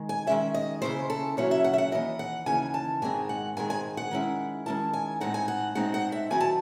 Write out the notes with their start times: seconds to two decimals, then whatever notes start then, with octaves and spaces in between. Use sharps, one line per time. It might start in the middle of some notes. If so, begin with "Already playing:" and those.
Already playing: D#3 G#3
0.09 G#5
0.27 D#3 G#3 C#4 E5
0.54 D#5
0.82 D#2 C#3 F#3 C#4 E4 C5
1.10 A4
1.37 D#2 C#3 F#3 C#4 E4 C#5
1.51 E5
1.64 F#5
1.73 E5
1.78 F#5
1.92 D#2 C#3 E3 D#5
2.19 F#5
2.46 D#2 C#3 E3 G#5
2.74 A5
3.02 G#2 D#3 G#3 C4 G#5
3.29 F#5
3.57 G#2 D#3 G#3 C4 G#5
3.70 G#5
3.97 F#5
4.11 D#3 G#3 C#4 E4
4.66 D#3 G#3 C#4 E4 A5
4.93 G#5
5.21 A2 G#3 C4 D#4 F#5
5.34 G#5
5.48 F#5
5.75 A2 G#3 C4 D#4 F#5
5.94 F#5
6.12 E5
6.30 D#3 F#3 C4 E4 G#5
6.40 A5